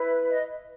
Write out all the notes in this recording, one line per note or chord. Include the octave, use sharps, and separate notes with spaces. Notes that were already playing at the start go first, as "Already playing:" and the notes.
Already playing: E4 B4
D#5